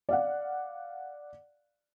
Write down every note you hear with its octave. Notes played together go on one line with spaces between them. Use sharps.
D5 F5 F#5